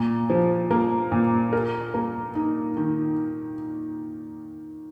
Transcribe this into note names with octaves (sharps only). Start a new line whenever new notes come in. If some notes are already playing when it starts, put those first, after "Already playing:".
Already playing: A#2
F3
A#3
A#2
A#4
A#3
D#4
D#3